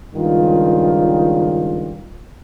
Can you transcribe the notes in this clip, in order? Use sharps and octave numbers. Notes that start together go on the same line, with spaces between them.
C#2 G2 D#3 F4